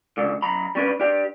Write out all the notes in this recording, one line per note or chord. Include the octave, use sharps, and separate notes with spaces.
C#2 D3
F#2 A#5 B5
G3 C#4 D4 B4
D4 G4